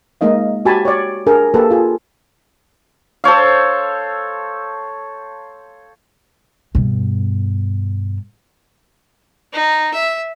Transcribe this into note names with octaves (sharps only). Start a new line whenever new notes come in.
G#3 A#3 D#4 D#5 F5
F#4 G4 G#5 A5 B5
C#5 D5
D4 G#4 A#4
A#3 G4 A4 B4
F4 G#4
A4 C5 C#5 F5
G2 B2
D#4
E5